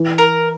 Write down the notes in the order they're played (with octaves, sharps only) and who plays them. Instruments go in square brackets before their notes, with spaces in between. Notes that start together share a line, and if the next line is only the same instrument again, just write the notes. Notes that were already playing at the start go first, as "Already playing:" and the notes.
Already playing: [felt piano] E3
[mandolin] A#4